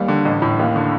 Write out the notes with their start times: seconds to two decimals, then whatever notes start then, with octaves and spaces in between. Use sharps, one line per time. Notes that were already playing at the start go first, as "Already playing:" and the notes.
Already playing: D#2 G3
0.08 D3
0.25 A1
0.42 A2
0.59 D#2
0.76 D3